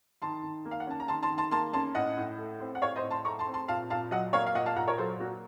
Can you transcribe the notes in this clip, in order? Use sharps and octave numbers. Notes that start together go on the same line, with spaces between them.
D#3 A5 C6
D#3
A#3
F5
F#5
C#4 A5
A#5
D#3 A5 C6
A5 C6
D#3
A5 C6
A#3 A5 C6
C#4 A5 C6
A2 D#5 F#5
A2
A3
C4
F#5
A2 C#5 F5
C5 D#5
A2
A5 C6
A3 A#5 C#6
A5 C6
C4
A5 C6
A#2 F5 A5
A#2 F5 A5
F#3 D#5 F#5
A#3 C#5 F5
F5
A#2 D#5 F#5
F5 A5
A#2 F#5 A#5
A#4 C#5
F#3 A4 C5
A#3 F#4